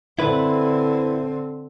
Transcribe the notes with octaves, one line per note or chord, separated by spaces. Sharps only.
D3 C4 E4 B4